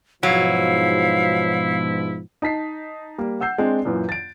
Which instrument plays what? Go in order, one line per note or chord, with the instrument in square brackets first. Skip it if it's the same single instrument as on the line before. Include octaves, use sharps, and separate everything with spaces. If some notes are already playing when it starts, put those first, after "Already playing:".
[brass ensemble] G#2 B2 F3 [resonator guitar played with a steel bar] F#3 [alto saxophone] E4 [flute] F5
[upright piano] D#4 A5 B6 C7
G3 A#3
F#5 E6 G6 C7
G#3 C4 D4
F#2 A#2 E3
A6 D7